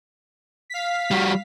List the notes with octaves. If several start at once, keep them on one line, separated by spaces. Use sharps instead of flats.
F5 B6
G3 F#4